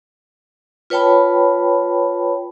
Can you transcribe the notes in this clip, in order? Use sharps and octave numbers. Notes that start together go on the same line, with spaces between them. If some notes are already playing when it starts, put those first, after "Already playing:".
F4 B4 C#5 G5 A5 B5